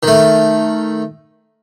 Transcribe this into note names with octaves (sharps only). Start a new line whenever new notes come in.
D#3 A3